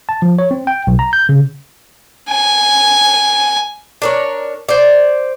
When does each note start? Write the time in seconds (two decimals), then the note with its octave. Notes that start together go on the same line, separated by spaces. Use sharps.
0.09 A5
0.22 F3
0.39 C#5
0.51 C4
0.67 G5
0.87 B1
0.99 A#5
1.13 G6
1.29 C#3
2.30 G#5
4.02 D4 A#4 C#5
4.69 C5 D5